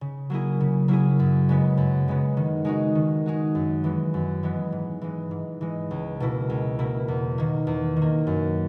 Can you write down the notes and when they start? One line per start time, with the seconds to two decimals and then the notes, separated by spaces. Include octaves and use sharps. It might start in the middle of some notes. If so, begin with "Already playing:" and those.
0.01 C#3
0.30 F#3 A#3 E4 G#4
0.60 C#3
0.88 F#3 A#3 E4 G#4
1.19 F#2
1.49 C#3 G#3 B3
1.77 F#2
2.08 C#3 G#3 B3
2.37 D#3
2.65 G#3 D#4 F#4
2.95 D#3
3.26 G#3 D#4 F#4
3.55 F#2
3.84 E3 G#3 B3
4.14 F#2
4.43 E3 G#3 B3
4.72 G#2
5.01 E3 G#3
5.31 G#2
5.61 E3 G#3
5.91 C#2
6.20 B2 A#3 E4
6.50 C#2
6.79 B2 A#3 E4
7.08 E2
7.38 D#3 A#3
7.67 E2
7.96 D#3
8.02 A#3
8.27 F#2